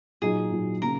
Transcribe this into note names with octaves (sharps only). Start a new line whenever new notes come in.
A#2 F#3 D#4 G#4
A#2 F#3 D#4
C#3 F#3 A#3 A#4